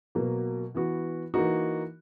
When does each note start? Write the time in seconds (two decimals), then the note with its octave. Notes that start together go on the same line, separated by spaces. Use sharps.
0.15 B2 F#3 A#3
0.75 E3 B3 F#4
1.34 E3 A#3 D#4 F#4